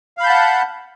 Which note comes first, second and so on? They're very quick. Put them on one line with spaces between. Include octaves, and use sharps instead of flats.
F5 B5 G6 A5 F#5